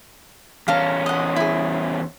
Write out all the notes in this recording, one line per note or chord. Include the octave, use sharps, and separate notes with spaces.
E2 C#4 F5 A5 A#5
D#5 F#5
E4 G#4